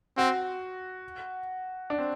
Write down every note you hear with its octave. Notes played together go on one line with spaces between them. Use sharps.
C4 F#4
D4
C4